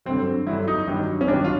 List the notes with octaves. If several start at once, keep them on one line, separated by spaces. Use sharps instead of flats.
G2 D3 F#3 C4
G2 D3 F#3 E4
D#4
G2 D#3 F#3
C#4
G2 D#3 F#3 D4
F4